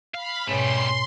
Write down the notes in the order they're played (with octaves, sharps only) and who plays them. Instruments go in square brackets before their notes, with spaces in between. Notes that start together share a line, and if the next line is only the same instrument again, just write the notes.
[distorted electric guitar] F5 [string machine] B5
[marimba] G#2 B2 [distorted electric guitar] G3 A3 [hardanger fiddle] C#4 [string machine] C6